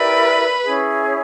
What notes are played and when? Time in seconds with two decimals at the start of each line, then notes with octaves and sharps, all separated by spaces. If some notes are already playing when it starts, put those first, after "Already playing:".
Already playing: E4 G4 A#4 B4 D5
0.64 C#4 E4 G#4